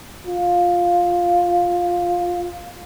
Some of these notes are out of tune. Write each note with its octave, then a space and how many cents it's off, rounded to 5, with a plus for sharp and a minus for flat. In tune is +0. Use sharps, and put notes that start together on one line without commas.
F4 +10